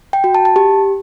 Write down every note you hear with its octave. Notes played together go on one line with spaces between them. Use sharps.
G5
F#4
A5
A5
G4